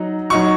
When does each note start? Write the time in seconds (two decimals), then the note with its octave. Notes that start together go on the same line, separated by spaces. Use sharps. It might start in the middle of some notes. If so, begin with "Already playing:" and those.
Already playing: F#3 D#4 F#4
0.30 F#3 D#4 F#4 C#6